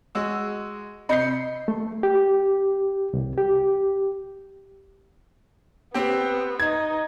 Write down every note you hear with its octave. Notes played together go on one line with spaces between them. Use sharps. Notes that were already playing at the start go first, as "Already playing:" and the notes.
G#3 F#4 E6
C3 D#5 B5 G6 C7 C#7
A3
G4
C2
G4
B3 C4 G4
D#4 D#5 G#6